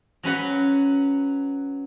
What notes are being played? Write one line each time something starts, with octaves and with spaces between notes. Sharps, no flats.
F#3 C#4 B4 F#5